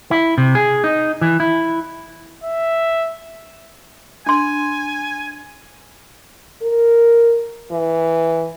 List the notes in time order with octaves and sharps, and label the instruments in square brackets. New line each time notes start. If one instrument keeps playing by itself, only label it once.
[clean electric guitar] E4
C3
G#4
D#4
E3
E4
[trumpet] E5
[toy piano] D4 C6 [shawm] G#5
[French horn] A#4
E3